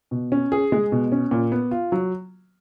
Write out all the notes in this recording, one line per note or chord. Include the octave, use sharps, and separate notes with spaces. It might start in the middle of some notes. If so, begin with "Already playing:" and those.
B2
C#4
G#4
G#3
B2
C#4
A#2
B3
F4
F#3